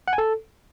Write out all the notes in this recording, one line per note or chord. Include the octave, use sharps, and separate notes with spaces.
F#5
G#5
A4